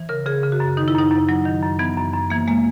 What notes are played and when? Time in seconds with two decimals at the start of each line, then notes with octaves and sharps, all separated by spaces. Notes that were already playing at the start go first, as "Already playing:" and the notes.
Already playing: E3
0.09 C#3 A#4
0.26 C#3 G#4
0.43 C#3
0.52 F#4
0.60 F#2
0.77 D#3 D#4
0.88 E4
0.95 F#2 D#4
1.11 F#2
1.29 F#3
1.45 D#3
1.62 F#2
1.79 E3 B3
1.97 F#2
2.14 F#2
2.30 E3 A#3
2.48 G#3 A#3